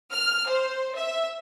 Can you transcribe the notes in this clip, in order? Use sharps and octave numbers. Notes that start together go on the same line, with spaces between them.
F6
C5
E5